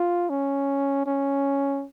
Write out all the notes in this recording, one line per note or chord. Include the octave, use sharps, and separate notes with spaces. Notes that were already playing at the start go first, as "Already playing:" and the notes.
Already playing: F4
C#4
C#4